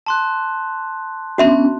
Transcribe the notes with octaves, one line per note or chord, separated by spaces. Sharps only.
A5 C6 F#6
B3 C#4 D4 F#4 E5 C6